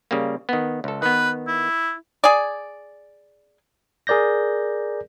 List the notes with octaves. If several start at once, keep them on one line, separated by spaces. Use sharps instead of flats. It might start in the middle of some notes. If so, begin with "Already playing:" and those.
C#3 G3 A#3
D#3 B3
C#2 A4
D#3 B3 B4
E4
G#4 D5
G#4 A#4 D5 G6 A#6